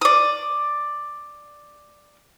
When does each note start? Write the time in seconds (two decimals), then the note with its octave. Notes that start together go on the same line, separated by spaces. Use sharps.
0.01 D5 D#6